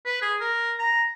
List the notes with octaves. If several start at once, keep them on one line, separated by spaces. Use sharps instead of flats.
B4
G#4
A#4
A#5